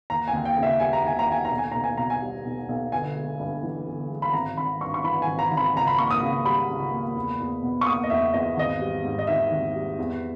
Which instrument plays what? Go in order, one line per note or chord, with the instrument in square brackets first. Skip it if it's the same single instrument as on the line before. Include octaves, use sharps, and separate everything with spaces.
[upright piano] D#2 A#5
G#5
D#2
G5
C#3
E5
G3 G#5
A#5
D#2 G#5
A#5
D#2 G#5
A#5
B1
G#5
B1 A#5
G#5
B2 A#5
G#5
G3
B1
B1
G1 G#5
G#3
G2
E3
G1
G#3
B5
G#1 A#5
G#1 B5
G2 C#6
C#6
E3 B5
G#1 G#5
A#5
G#1
B5
C#2 A#5
B5
A#3 C#6
D#6
C#3
G3 B5
C#2
A#3
E2
E2
B2
C#6
A#3 D#6
D#5
E2 E5
E2 D#5
G#1 D#5
G3
G#2
D#5
D#3 E5
G#1
G3
E2